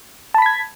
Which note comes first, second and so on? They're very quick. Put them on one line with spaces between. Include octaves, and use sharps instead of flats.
A5 B5 B6 G#6